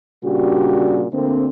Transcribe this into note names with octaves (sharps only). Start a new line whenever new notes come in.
A#2 C#3 G3 D4 F#4 G4
D2 D3 A#3 C4